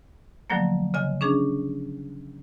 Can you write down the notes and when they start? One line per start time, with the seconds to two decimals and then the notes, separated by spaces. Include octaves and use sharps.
0.50 D3 F3 F#3 A3 A#3
0.94 C#3 D#5 G#5
1.21 C#4 D4 G#4